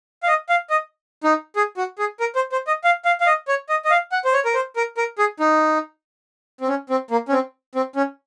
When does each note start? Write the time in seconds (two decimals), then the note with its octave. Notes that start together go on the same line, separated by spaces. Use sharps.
0.23 F5
0.28 D#5
0.49 F5
0.70 D#5
1.24 D#4
1.56 G#4
1.77 F#4
1.99 G#4
2.20 A#4
2.35 C5
2.52 C5
2.67 D#5
2.84 F5
3.05 F5
3.20 F5
3.27 D#5
3.48 C#5
3.69 D#5
3.85 D#5
3.90 F5
4.12 F#5
4.25 C5
4.33 C#5
4.45 A#4
4.54 C5
4.76 A#4
4.97 A#4
5.18 G#4
5.40 D#4
6.61 C4
6.68 C#4
6.90 C4
7.11 A#3
7.29 C#4
7.32 C4
7.75 C4
7.96 C#4